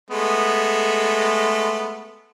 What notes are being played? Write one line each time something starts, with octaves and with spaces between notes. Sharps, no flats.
G#3 A3 B3